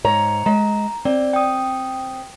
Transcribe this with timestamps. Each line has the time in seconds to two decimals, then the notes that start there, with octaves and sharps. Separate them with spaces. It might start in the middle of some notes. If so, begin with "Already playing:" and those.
0.04 G#2 C#5 A#5
0.46 G#3 A#5
1.05 C4 D5
1.33 G5 D#6